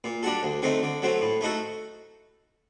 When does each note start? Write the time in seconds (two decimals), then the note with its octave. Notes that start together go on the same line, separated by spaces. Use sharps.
0.04 A#2
0.23 G3 D4 F#4 A4
0.43 D2
0.62 D3 A3 C4 D#4
0.83 D3
1.02 F#3 A3 C4
1.21 A2
1.41 A3 D#4 F#4 A4